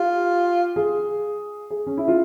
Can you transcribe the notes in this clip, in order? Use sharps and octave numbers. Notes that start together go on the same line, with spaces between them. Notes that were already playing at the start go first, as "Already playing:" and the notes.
Already playing: F4 G4
G#4
G#4
C#4
E4
F4